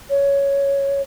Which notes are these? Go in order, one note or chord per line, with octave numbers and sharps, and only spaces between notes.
C#5